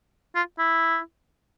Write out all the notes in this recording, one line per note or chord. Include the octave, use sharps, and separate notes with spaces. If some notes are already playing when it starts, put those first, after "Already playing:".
F4
E4